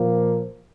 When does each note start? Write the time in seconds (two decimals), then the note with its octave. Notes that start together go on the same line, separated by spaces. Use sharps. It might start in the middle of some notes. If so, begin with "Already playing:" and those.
Already playing: A#2 F3 A#3